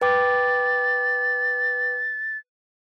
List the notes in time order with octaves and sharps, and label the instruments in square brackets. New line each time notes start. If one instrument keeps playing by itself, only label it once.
[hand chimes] B4 G5 D6 [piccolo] A6